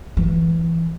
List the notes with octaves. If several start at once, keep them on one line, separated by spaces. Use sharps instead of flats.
E3